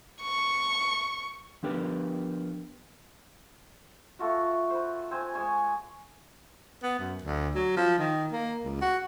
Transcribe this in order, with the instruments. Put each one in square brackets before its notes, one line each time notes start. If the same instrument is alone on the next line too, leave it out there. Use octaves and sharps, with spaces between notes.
[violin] C#6
[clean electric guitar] F3 B3 D4 G4 A#4 B4
[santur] A3 F4 F#4
B4 C5
C4 C5 G#5
G#3 G#5 C#6
[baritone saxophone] B3
F#2
D2
F#3
F3
D#3
A#3
C#2
F#4